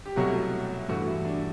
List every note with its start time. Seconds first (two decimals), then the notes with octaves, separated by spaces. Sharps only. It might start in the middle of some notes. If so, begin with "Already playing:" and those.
0.06 G4
0.16 C2 B2 F#3 A3 F#4
0.88 G2 E3 A3 F#4
1.07 E4
1.25 D4